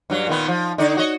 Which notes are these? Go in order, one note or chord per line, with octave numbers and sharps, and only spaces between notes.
G2 F#3
A#2 D#3 B3
F3
D3 D#4 D5
F#4 C#5 D#5